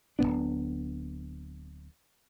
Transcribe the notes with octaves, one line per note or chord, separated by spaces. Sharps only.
D1 A2 B3 D4